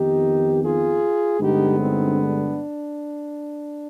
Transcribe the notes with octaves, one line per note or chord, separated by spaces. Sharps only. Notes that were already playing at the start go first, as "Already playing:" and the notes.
Already playing: F2 D#3 B3 D#4 G4
F4 G#4
G2 D3 G#3 B3 D#4 G4
C4 D#4
D4